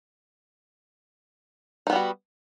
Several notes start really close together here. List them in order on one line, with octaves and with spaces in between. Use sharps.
D#4 B3 G3 F#4